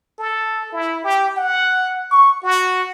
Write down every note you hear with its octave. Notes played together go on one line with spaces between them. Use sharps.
A4
E4
G4
F#5
C#6
F#4